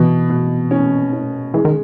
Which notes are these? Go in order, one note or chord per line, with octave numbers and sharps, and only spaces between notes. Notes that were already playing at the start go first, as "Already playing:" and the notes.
Already playing: B2 E3
B2
C#4
C#4
E3 G#3
D#3